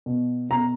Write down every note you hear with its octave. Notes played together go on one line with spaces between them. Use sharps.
B2
B2 A#5